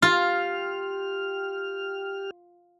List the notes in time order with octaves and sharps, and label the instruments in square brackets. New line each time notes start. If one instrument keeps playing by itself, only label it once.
[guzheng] F4 [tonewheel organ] G4 F6